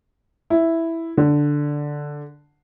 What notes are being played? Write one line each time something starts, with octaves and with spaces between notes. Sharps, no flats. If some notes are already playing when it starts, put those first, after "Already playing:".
E4
D3